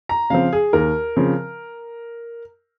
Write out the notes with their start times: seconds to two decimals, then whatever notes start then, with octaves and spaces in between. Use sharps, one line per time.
0.09 A#5
0.30 C#3 F3 C4 F5
0.53 G#4
0.73 D#2 A#4
1.17 C#3 F3 C4